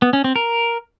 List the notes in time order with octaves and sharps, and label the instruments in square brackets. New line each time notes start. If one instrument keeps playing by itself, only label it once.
[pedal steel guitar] B3
C#4
C4
A#4